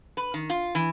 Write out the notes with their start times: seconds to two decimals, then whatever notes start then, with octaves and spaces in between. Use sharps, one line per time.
0.17 B4
0.34 D#3
0.50 F4
0.75 E3